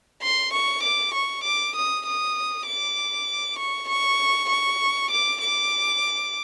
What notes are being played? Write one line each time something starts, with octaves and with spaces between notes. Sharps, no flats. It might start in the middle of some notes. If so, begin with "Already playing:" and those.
C6
C#6
D6
C#6
D6
D#6
D#6
D6
C#6
C#6
C#6
D6
D6